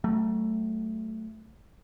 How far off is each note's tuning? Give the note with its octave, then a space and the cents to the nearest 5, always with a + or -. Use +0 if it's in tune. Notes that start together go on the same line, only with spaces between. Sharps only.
F#3 +45 A3 +10